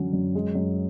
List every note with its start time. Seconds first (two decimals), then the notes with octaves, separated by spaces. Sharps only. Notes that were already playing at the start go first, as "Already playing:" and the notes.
Already playing: F#2 D3 F#3 C#4
0.13 F#2
0.35 G#3
0.55 F#2